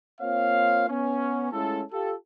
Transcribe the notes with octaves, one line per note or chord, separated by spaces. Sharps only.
A#3 C4 F4 C#5 F5
B3 C#4
G#3 A3 C#4 E4 F4 A4
F4 G4 A4